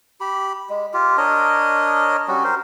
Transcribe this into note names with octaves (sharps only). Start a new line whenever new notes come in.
G4 B5
G#3
F4 G4
D4 A#4 C#5 D#5
G3 C#4 F#4
A#4 C5